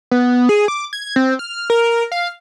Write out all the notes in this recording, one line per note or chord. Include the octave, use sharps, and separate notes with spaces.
B3
G#4
D6
G#6
C4
F6
A#4
F5